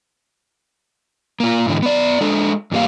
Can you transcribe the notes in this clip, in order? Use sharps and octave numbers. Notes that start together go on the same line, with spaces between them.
A#3 F4
G#2 D3 E3
B3 D5
G#3 D4 A4
E2 G#2 G3 A#3 F5